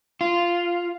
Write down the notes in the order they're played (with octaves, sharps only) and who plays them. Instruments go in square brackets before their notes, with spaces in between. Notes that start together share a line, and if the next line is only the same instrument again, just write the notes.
[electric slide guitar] F4